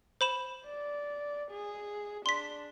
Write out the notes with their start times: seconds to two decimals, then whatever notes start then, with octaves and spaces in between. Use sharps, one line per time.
0.21 C5 B5 E7
0.66 D5
1.51 G#4
2.26 D4 C6 B6